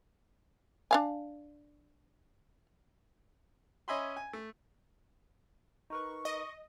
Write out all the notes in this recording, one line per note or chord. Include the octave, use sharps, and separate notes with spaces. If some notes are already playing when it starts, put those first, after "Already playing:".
D4 F5 G#5
C#4 D#5 E5 G#5 B5 C6
G#5
A3
D#4 A#4 B4 C#6
D#5